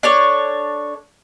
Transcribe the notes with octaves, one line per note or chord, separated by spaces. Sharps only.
D4 A4 C#5